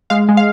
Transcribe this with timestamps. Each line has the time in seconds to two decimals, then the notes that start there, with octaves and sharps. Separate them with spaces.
0.10 G#3 F5
0.29 G#3
0.37 F5